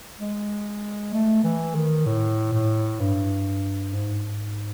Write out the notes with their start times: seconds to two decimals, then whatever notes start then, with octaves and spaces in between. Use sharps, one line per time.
0.19 G#3
1.13 A3
1.44 E3
1.75 D#3
2.06 A2
2.52 A2
3.00 G2
3.93 G#2